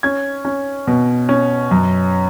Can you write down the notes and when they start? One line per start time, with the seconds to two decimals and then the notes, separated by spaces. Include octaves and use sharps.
0.03 C#4 G#6
0.45 C#4
0.87 B2
1.29 C#4
1.71 F#2